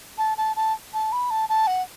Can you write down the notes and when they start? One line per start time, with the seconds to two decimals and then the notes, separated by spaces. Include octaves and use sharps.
0.18 A5
0.38 A5
0.56 A5
0.94 A5
1.12 B5
1.31 A5
1.49 A5
1.67 F#5